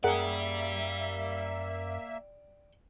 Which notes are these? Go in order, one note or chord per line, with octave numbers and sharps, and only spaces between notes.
F#2 A#3 G#4 A#4 D5 E5 F#5 G5